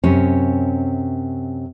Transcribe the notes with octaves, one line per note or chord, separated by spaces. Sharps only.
F#2 C3 C#4